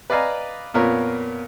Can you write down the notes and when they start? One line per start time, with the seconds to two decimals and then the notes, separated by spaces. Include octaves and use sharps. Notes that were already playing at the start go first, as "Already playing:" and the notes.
0.10 B4 D5 D#5 F5 G#5 A#5
0.74 F2 A#2 B3 A#4 C#5